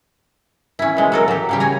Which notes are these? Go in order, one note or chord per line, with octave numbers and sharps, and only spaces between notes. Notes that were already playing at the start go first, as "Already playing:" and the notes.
C#4 E4
B2 G#3
F#3 A4 A#4
F#3 G4
C#3 G3 G4
C#5 G#5 A#5